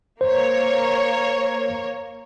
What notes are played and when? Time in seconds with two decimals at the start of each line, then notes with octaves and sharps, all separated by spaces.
0.21 A#3 C5 C#5